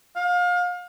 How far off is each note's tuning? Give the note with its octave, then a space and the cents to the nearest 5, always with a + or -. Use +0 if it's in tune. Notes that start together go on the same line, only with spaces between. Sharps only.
F5 +30